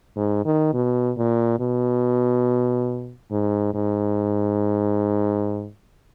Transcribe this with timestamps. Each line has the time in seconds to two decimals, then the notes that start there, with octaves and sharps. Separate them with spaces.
0.16 G#2
0.45 D#3
0.74 B2
1.17 A#2
1.60 B2
3.31 G#2
3.74 G#2